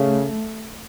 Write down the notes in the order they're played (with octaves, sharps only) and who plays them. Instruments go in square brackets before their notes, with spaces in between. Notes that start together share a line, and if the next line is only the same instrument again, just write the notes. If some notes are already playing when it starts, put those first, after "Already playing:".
Already playing: [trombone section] C#3 [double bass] A3